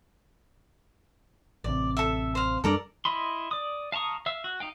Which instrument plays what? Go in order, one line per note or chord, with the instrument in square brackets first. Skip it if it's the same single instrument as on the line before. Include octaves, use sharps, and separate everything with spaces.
[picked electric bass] A1 C3 [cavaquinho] D5
[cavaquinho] A4 E5
C5 F5
[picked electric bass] F#2 G3 D4 [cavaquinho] A4 A#4 D5
[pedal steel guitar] E4 D#5 B5 C6
D5 D#6
F5 A5 A#5 C#6 D#6
E5 F5 E6
F#4
D#4 F5 G5